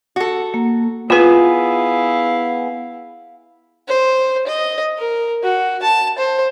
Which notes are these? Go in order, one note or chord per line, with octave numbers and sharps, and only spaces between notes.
F#4 A4
A#3
B3 E4 F4 G#4 B4 F5
C5
D#5
A#4
F#4
A5
C5